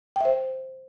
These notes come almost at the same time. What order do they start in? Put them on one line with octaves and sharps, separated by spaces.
G5 E5 C5